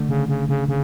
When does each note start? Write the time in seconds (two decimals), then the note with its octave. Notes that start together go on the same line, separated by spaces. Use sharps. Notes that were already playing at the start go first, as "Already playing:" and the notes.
Already playing: D3 A3 D4
0.09 C#3
0.28 C#3
0.49 C#3
0.68 C#3